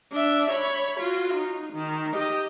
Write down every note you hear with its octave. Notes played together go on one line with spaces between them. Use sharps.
D4 E5
C#5 B5
F4 F#4
D#4
D#3
G4 D#5